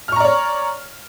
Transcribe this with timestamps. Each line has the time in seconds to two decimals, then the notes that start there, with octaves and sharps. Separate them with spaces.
0.08 F6
0.12 C#6
0.16 A#5
0.20 D5
0.24 C#5